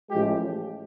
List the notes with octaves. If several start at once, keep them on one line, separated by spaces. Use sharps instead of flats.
A1 A2 F3 G#3 G4